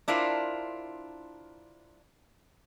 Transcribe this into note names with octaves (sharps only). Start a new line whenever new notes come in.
D4 E4 F4 A#4 C5